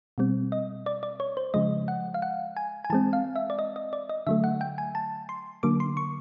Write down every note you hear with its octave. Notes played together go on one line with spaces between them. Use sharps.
B2 G3 C4
D#5
D5
D5
C#5
C5
C#3 F3 G#3 D#5
F#5
F5
F#5
G#5
G#5
E3 G#3 C4 A5
F5
E5
D5
D#5
D#5
D5
D#5
D3 F#3 A3 E5
F#5
G5
G#5
A5
C6
D3 F#3 A#3 D6
C6
C#6